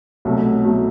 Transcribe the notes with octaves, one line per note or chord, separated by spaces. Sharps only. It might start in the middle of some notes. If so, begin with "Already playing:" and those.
C2 B2 F#3 A3
B2 F#3 A3